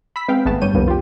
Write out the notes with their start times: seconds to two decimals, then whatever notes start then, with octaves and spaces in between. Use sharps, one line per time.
0.16 B5 E6 B6
0.28 G#3 B3 C4 G#4 F5 G5
0.45 G#1 A3 B3 G#4 A5 E7
0.62 G2 G3 C#5 G6 D#7
0.74 C2 F2 D#3 G3 A#3 B3
0.88 F4 G4